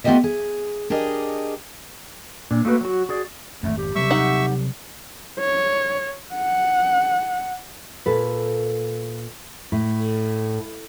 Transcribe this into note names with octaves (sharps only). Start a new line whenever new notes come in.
A3 B3 F4 G4 D#5 E5
G#4
D4 G4 G#4 A#4 D#5
A#2 D4
A3 A#3 F#4 G4 B4
F#3 F#4
F#4 G#4 D5
G#1 F2 A3
G4
C3 F#3 G3 E5 C#6 E6
D#4 F#5
C#5
F#5
A#2 A4 B4
A2